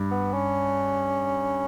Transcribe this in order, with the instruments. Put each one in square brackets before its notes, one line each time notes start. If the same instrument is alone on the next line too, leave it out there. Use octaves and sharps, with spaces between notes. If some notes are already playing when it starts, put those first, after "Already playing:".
Already playing: [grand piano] G2
[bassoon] B3
C#4